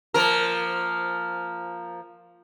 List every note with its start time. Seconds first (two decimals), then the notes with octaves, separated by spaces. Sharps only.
0.14 F3 A#3 A#4